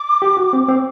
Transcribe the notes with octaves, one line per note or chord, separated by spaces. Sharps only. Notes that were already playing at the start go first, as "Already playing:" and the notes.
Already playing: D6
G4
F#4
C4
C4